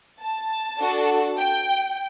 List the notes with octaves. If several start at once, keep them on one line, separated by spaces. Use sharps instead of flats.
A5
D4 F#4 A4
G5